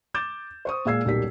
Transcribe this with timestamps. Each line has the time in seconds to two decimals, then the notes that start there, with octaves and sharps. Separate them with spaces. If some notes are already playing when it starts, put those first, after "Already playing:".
0.14 D6 G6 A6 E7
0.65 C5 C#6 D#6
0.85 A#2 G#3 F5 E6 G#6 C7
1.05 D#1 B1 G3 G4 A#4 B6